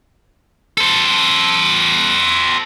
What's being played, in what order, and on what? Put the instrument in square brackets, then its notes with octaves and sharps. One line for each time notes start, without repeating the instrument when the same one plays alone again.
[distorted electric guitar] A4 C5